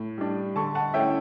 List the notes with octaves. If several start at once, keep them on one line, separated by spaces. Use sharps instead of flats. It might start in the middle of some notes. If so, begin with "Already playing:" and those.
Already playing: A2
G3 D4
D3 A5 C#6
F#5 A5
A3 C#4 E4 E5 G5